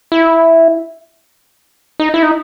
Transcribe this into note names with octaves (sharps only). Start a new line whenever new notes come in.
E4
D#4
E4
D#4